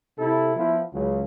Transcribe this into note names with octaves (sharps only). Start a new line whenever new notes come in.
C3 E4 A4
F3 B3 E4
C#2 C#3 F#3